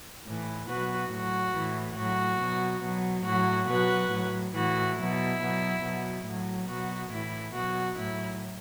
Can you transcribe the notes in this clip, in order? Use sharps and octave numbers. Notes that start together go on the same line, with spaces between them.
A2 E3
B2 F#3 F#4 B4
A2 F#3 F#4
A2 E3
A2 F#3 F#4
B2 F#3
B2 F#3
A2 F#3 F#4
B2 F#3 F#4 B4
A2 F#3
A2 E3 F#4
B2 F#3 E4
B2 F#3
B2 F#3
A2 F#3
B2 F#3 F#4
A2 E3 E4
B2 F#3 F#4
A2 F#3 E4